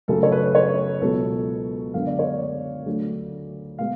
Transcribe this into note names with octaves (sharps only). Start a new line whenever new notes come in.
F#2 C#3 F#3 A3 A4
C#5
B4
C#5
B4
C#2 B2 F#3 B3 A4
F#2 D3 G#3 B3 F5
D5
C#5
D5
D2 D3 F#3 A3
B2 G#3 B3 F5